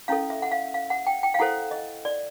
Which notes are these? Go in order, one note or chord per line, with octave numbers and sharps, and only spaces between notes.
C#4 E4 A4 F5
E5
F#5
F5
F5
F#5
G5
G5
F5
E4 A4 C5 F#5
D#5
D5